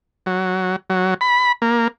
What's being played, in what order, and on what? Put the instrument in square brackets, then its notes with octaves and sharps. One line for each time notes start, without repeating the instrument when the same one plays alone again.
[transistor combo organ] F#3
F#3
B5
A#3